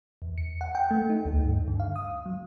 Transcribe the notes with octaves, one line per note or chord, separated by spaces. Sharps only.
E2
C#7
F#5
G5
A3
D#4
D2
G2
D3
F5
D#6
F#3